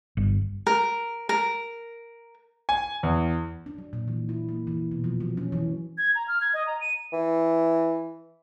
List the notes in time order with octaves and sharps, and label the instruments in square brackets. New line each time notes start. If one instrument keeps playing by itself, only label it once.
[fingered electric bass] G1
[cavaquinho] A#4
A#4
[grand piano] G#5
E2
[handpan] D4
F#3
A#2
E3
E4
A#3
E3
B2
F3
F#3
C#4
E3
[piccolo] G#6
A#5
F6
G#6
D#5
A#5
D#7
[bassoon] E3